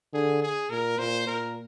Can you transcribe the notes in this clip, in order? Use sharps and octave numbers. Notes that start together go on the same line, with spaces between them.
D3 G#4
G#4
A#2 A#4
A#2 C5
A#2 A#4